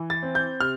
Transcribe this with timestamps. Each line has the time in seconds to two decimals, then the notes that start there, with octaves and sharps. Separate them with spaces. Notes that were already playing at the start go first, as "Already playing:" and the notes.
Already playing: E3
0.10 A6
0.23 C4
0.35 G6
0.61 C3 F6